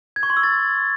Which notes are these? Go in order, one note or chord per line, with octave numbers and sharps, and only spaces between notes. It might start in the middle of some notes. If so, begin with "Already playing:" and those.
G#6
C#6
C6
E6
A6